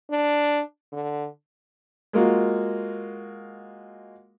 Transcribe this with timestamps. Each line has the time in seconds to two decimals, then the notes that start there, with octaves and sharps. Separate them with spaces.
0.11 D4
0.93 D3
2.13 G#3 A#3 F4 F#4